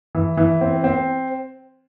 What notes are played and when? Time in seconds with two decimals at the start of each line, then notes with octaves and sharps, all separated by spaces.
0.15 E3
0.37 E3
0.61 C4
0.84 C4